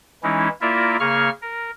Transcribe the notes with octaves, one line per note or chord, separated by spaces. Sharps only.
E3 G#3 C#4 D#4 E4
A#3 E4 F4 A#4 D5 E5
C#3 A#3 G#4 C#6 F6
A#4